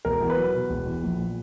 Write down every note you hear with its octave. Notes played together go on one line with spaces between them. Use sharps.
E1 A#4
E2
B4
F#3
B2
E1
E2
A#1
A#2